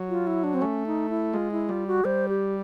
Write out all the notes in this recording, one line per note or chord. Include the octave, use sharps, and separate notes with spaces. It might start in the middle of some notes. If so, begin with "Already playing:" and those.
Already playing: F#3
F4
E4
D4
C4
A3 C#4
D#4
E4
G#3 F4
E4
G3 F4
F#4
G3 C5
G4